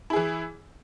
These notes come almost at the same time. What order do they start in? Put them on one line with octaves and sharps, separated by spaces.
E4 G#4 E3